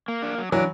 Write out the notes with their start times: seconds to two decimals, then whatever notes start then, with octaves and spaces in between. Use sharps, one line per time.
0.08 A#3
0.23 D4
0.38 F#3
0.52 E3 F#3 D4